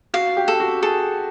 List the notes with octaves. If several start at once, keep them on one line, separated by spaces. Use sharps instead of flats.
F#4 F5
G4
A4
F#4
G#4 A4